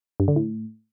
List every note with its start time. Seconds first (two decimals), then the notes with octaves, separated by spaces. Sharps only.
0.20 G2
0.28 D3
0.36 A2